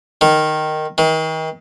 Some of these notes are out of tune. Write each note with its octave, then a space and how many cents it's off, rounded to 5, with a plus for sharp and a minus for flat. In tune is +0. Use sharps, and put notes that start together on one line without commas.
D#3 -10
D#3 +35